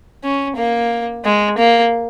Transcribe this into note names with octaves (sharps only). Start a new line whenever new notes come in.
C#4
A#3
G#3
A#3